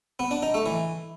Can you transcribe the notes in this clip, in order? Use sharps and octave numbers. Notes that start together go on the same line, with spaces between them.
B3
D4
D#4
A3
E3